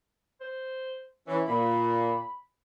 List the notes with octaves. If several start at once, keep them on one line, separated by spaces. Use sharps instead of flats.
C5
E3 C#4
A#2 B5